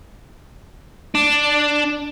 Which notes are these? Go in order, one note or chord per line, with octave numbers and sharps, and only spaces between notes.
D4